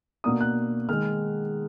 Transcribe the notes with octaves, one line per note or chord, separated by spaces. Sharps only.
B2 A#3 D4 D#6
F#6
D#3 G#3 D#4 F6